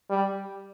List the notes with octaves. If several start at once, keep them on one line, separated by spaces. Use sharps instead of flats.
G3